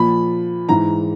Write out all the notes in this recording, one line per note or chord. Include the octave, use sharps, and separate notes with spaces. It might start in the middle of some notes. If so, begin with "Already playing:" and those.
Already playing: A#2 F3 B5
G#2 E3 A#5